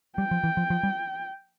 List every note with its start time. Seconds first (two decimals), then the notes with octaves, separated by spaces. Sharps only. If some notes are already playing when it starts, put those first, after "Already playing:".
0.18 G3 G5
0.31 F3
0.44 E3
0.57 F3
0.70 F3
0.83 G3